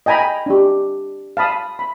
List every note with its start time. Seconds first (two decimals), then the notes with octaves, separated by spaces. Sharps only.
0.06 D#5 G5 G#5 A#5 B5
0.46 D4 G4
1.37 F5 A5 B5 D#6
1.79 B5